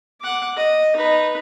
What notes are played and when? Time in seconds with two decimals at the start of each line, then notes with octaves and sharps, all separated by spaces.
0.21 F#5 D6
0.57 D#5
0.96 D#4 B4